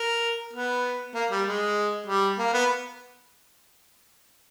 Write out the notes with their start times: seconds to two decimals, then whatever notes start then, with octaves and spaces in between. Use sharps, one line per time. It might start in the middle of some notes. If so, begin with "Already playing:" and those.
Already playing: A#4
0.53 B3
1.14 A#3
1.30 G3
1.46 G#3
2.07 G3
2.38 A#3
2.54 B3